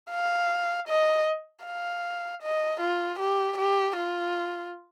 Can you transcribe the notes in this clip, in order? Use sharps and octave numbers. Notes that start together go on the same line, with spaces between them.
F5
D#5
F5
D#5
F4
G4
G4
F4